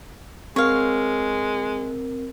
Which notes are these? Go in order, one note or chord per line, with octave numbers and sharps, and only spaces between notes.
G#3 C4 A#4 C#5 F5